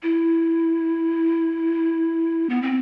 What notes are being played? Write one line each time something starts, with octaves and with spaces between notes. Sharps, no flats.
E4
B3
C4